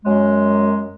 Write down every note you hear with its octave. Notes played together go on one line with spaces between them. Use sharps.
F#2 G#3